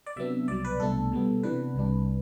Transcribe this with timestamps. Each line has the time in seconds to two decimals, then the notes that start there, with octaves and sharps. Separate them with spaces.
0.06 D5
0.16 C3 F#3 B3 D4 E5
0.48 C2 B2 F#3 D5
0.65 B4
0.80 C2 B2 A3 D4 A4
1.12 B2 G3 B3
1.43 C3 E3 B3 D4 B4
1.75 C2 C3 G3 D4